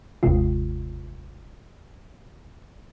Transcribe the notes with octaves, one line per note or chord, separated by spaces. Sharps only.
G1 D#2 C3 G#3 F4